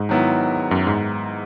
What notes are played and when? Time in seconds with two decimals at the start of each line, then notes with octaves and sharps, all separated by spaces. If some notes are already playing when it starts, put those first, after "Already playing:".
Already playing: G#2
0.09 D#3 F#3 B3 E4
0.71 F#2
0.87 G#2